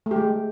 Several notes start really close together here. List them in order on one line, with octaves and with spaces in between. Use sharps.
A3 G4 G#3